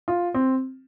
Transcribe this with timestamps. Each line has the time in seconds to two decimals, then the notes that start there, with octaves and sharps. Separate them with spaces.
0.08 F4
0.34 C4